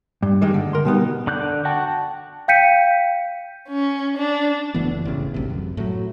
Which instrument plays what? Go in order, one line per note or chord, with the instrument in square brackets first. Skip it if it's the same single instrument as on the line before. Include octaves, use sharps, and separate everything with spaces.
[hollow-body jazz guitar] G2
D#3 G3 G#3
D3
A#4 C6
B2 G3 B3 D#4
[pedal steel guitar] D3 D6 F#6 G6
F#4 F#5 G5 A5
[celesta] F5 G5 G6 B6 C#7 D#7
[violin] C#4
D4
[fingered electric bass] F#1 E3 A3 B3
A1 C#3
G#1 D2 C3
F#2
A2 F#3